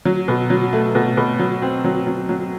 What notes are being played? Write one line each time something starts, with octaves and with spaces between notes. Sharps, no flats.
F#3
B2
F#3
A3
B2
B2
F#3
C4
F#3
F#3
F#3